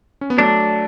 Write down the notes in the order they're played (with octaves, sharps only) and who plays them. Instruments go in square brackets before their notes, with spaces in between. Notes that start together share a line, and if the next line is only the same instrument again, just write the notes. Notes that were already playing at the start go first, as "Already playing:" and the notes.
[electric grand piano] C#4
B3
[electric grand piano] F#3 A3 [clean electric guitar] D4